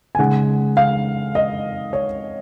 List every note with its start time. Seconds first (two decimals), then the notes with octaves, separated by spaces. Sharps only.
0.15 G#5
0.19 C#3 G#3 D#4 F#5
0.77 F5
1.35 D#5
1.93 C#5